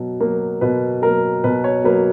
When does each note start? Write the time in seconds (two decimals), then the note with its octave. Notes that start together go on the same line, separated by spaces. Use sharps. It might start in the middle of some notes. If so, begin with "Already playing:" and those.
Already playing: B2 F#3
0.21 F#3 A#3
0.61 B2 B4
1.02 F#3 A#3 A#4
1.44 B2 B4
1.64 C#5
1.84 F#3 A#3 B4